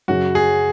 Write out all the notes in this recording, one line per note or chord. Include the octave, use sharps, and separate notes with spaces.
F#2 C#3 F#3 F#4
G#4